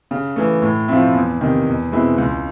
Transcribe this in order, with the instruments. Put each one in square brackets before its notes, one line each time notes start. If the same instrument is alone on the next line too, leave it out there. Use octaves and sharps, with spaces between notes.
[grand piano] C#3
E3 A3
A2
F3 A3 C4 E4
E2
C3 D#3
E2
B2 G#3 C4 E4
C#2